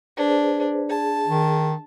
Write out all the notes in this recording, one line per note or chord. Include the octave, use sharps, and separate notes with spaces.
D4 G#4 B4 C5
G#4 A5
D#3